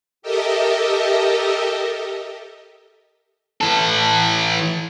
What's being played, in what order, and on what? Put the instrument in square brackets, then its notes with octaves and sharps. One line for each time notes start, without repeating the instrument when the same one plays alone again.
[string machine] G4 A4 A#4 D#5 E5
[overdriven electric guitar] E3 A4